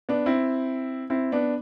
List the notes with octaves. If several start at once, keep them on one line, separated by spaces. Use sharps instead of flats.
B3 D4
C4 E4
C4 E4
B3 D4